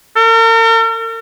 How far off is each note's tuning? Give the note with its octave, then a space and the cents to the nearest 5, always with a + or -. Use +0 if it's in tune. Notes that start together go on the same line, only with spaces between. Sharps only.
A#4 -45